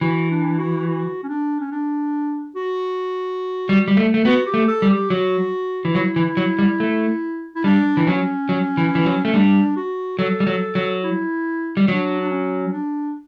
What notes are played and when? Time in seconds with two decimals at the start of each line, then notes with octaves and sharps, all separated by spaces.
0.01 E3 F#4
0.30 D4
0.58 F#4
0.87 F#4
1.23 C#4
1.28 D4
1.60 C#4
1.71 D4
2.55 F#4
3.69 G3
3.88 G3
3.97 A3
4.14 A3
4.25 B3 F#4
4.46 G4
4.54 A3
4.68 A4
4.82 G3
4.90 G4
5.10 F#3 F#4
5.85 E3
5.95 F#3 E4
6.16 E3
6.37 F#3
6.59 G3
6.80 A3
7.55 E4
7.64 G3 D4
7.97 E3
8.07 F#3 C#4
8.49 F#3
8.77 E3
8.95 E3
9.06 F#3
9.25 A3 C#4
9.34 G3 D4
9.76 F#4
10.19 F#3 A4
10.40 G3
10.47 F#3
10.75 F#3
11.04 E4
11.77 G3
11.88 F#3 D4
12.20 D4
12.30 C#4
12.73 D4